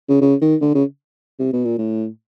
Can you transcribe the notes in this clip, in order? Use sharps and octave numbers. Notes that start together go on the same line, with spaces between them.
C#3
C#3
D#3
D3
C#3
C3
B2
A#2
A2